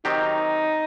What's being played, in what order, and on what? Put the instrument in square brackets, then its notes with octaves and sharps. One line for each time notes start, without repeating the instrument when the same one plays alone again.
[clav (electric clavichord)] D#3 F#3 C4 G4 [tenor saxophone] D#4